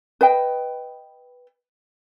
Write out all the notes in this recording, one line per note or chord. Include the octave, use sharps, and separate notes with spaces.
B4 D#5 G5